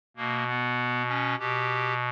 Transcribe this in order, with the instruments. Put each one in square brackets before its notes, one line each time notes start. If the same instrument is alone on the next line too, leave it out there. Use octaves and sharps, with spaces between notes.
[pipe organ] B2 A#3
B3
C#4
B2 G4